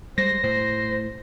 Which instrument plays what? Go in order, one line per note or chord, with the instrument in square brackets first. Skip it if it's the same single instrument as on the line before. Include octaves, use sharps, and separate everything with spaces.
[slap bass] G3 G#3 [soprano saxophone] C5 [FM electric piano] A#6
[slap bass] A2 [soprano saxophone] C5